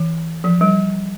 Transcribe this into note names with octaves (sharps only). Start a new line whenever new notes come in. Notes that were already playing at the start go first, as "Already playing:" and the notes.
Already playing: E3
F3
G3